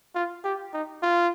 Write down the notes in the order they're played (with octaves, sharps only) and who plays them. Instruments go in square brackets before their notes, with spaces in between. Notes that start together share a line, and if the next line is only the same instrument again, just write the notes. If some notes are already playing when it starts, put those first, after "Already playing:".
[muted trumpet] F4
G4
D#4
F4